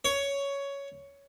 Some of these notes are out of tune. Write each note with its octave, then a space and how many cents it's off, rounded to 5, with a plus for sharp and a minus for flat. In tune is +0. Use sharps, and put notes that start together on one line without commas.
C#5 +10